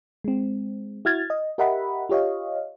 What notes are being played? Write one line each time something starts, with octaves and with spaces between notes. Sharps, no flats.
G#3 C4
E4 F#4 F6 G#6 A6
D#5
G4 A#4 D#5 E5 F#5 B5
F4 G4 C#5 D#5 F5